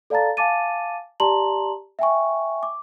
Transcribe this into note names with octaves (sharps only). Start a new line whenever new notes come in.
A4 D5 F5 A5 A#5 A6
F5 G#5 A5 D6 A6 D#7
G4 D5 A5 A#5 C6 F#7
E5 G5 G#5 C#6
D6